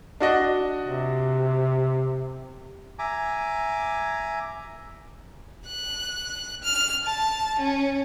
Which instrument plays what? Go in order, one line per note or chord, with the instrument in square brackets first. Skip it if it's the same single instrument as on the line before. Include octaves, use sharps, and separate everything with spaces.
[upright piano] D4 F#4 D#5
[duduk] C3
[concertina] E5 G#5 A#5 D6
[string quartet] F#6
F6
A5
C#4